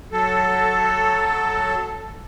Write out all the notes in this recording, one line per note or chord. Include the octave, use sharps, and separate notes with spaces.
F#3 A4